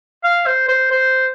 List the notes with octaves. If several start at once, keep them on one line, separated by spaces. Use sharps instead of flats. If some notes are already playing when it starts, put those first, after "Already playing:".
F5
C5
C5
C5